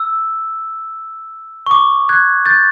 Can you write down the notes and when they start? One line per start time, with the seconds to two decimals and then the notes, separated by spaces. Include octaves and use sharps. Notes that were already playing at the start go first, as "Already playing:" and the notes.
Already playing: E6
1.66 C#6
1.71 D6
2.09 F#6 G#6
2.46 G6 A6